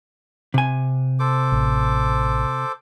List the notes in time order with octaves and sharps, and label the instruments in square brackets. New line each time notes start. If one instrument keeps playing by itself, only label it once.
[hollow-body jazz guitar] C3 G#5
[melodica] A4 C5 D6
[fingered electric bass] A1